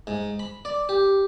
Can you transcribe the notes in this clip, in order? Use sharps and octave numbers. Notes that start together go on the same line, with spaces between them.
G#2
B5
D5
G4